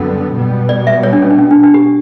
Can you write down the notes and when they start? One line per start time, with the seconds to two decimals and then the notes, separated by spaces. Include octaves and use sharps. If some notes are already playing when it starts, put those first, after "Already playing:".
Already playing: F#2 D3 G3 B3 F#4
0.33 B2 G3 B3
0.69 D5
0.87 E5
1.03 C#5
1.13 D4
1.22 C#4
1.31 D4
1.39 C#4
1.51 D4
1.63 D4
1.74 G4